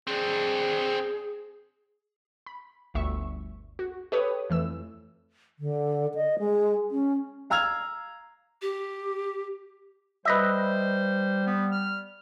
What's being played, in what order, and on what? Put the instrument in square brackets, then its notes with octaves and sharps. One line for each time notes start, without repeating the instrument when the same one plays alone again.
[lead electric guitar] C4 D4 [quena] G#4
[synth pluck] B5
G1 D2 E5 C#6
F#4
G4 A4 B4 C#5 D#6
F2 E3 A3 E6
[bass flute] D3
D#5
G#3
C#4
[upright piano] F5 A#5 E6 F6 G#6 F7
[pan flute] G4
[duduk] G3 [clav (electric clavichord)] B4 D#5 E5 [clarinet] C5
[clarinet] B3
F6